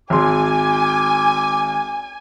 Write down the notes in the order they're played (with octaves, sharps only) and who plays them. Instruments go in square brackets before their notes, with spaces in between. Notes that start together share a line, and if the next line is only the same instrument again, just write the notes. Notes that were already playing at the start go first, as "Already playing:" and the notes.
[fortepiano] G#1 C6 [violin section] G#5 [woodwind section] D6